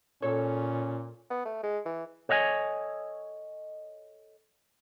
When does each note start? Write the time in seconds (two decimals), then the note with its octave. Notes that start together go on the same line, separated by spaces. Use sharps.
0.22 A#2 C#4 A4 C#5
1.30 B3
1.45 A3
1.63 G#3
1.85 E3
2.29 A4 C#5 D#5 F5 G#5